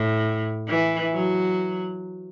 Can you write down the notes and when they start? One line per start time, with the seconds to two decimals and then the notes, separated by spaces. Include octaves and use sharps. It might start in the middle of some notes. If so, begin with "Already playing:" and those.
Already playing: A2
0.68 E3
1.12 F#3